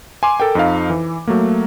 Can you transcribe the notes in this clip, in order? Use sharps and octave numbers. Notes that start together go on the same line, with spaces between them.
G#5 C6 D6
A4 A#4 G5
F2 D#4 F5
E3
F#3 A3 A#3